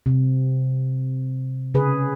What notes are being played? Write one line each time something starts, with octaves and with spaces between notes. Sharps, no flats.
C3
C#3 G#4 B4